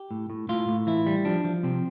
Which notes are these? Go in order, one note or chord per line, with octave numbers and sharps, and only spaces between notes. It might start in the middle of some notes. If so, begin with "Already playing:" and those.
Already playing: G4
A2
A2
A2 F4
A2
E3 E4
G3
F3 D4
F3
C3 C4